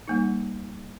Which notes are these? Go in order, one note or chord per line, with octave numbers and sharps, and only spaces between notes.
G3 A#3 D#4